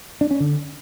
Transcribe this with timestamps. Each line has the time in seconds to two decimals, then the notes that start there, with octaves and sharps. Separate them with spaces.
0.21 D4
0.31 C#4
0.40 D3